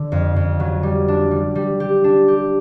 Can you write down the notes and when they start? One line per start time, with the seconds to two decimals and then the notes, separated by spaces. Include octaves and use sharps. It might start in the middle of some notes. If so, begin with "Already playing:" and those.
Already playing: D3
0.12 F2
0.36 F2
0.60 F#3
0.83 G3
1.08 D4
1.31 G3
1.55 G3
1.80 G4
2.04 D4
2.28 G4